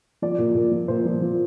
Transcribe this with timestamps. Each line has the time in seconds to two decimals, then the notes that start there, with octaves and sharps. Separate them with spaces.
0.22 F3 D5
0.38 A#2
0.55 A#2
0.72 F3
0.88 A#2 C5
1.06 F3
1.22 F3